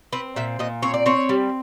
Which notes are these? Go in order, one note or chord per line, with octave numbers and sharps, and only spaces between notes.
C4 B4
A#2 E5
A#2 D#5
C4 C#5
D5
C4 C#5
G3